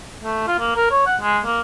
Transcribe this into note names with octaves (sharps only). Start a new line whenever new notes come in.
A3
F4
A#3
A#4
C#5
F#5
G#3
A#3